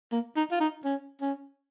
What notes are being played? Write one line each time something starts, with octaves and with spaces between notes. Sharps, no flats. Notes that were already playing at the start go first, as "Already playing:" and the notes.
A#3
D#4
F4
D#4
C#4
C#4